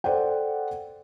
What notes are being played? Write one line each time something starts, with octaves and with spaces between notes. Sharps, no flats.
A4 C5 D5 F#5 G5